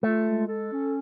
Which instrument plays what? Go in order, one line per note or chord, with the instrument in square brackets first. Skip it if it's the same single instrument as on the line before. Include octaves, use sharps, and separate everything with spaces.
[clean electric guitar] A3 [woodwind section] F4
[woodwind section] G#3
A4
C#4